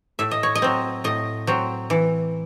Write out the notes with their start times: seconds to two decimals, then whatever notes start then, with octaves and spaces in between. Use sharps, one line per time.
0.19 A2 E5
0.31 D#5
0.43 C#5
0.55 D#5
0.62 F#3 C4
1.04 A2 D#5
1.47 F#3 C4
1.90 E3